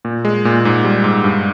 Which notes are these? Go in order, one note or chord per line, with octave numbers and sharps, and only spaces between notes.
A#2
G#3
A#2
G#2
G3
G#2
G2